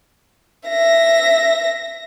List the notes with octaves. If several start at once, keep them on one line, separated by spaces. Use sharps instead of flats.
E5 A#6